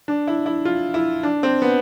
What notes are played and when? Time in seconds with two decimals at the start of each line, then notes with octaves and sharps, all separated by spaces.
0.08 D4
0.27 E4
0.46 E4
0.65 F4
0.94 E4
1.23 D4
1.43 C4
1.62 B3